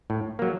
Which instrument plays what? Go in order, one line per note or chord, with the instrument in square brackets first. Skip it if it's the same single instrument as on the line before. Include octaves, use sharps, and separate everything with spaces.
[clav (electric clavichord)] A2
F#3 A#3